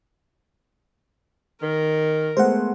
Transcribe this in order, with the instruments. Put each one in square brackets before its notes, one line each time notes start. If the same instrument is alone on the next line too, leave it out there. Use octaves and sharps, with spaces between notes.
[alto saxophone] D#3 [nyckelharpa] A#4
[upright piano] G#3 A3 B3 [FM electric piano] C5 F#5